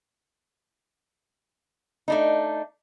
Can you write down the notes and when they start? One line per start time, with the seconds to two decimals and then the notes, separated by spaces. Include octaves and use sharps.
2.08 A3 D4 D#4